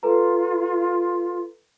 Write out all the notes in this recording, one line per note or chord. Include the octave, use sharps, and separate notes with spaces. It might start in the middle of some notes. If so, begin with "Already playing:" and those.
F4 A4 B4 A#5